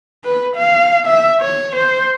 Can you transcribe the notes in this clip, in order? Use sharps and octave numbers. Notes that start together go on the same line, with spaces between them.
B4
F5
E5
C#5
C5